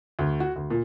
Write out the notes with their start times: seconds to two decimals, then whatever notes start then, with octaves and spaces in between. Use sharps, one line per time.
0.19 D2
0.40 F#4
0.56 D2
0.70 A#2